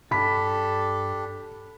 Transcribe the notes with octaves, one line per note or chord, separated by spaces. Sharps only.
G2 D4 G4 A4 B5 B6